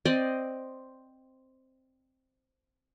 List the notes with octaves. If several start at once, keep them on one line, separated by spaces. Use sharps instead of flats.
C4 D5 D#5